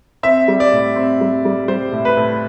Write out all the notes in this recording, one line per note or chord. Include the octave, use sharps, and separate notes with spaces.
C4 E5
G3
D5
A2
C4
G3
G3
G3 C5
A2
B4
A2